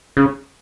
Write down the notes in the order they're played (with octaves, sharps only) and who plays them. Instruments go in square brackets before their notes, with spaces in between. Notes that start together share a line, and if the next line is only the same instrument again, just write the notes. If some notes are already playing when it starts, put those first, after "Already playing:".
[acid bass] C#3